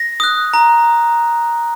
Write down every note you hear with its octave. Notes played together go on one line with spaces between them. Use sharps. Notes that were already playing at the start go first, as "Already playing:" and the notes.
Already playing: A#6
D#6 F#6
A#5